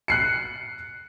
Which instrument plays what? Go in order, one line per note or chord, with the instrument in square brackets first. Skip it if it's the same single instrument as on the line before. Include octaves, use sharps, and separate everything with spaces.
[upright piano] F#6 C7 C#7